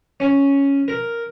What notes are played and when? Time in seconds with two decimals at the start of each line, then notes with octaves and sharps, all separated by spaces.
0.20 C#4
0.88 A#4